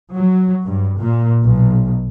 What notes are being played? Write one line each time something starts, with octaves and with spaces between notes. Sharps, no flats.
F#3
G2
A#2
B1